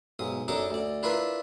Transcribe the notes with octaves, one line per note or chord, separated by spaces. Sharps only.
B1 G#2 D#6
F#2 D4 D#4 A4 A#5 D6
D2 D5
D4 E4 F4 A#4 B4